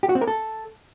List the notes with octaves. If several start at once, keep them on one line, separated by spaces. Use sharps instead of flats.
G4
F#4
C4
A#4
A4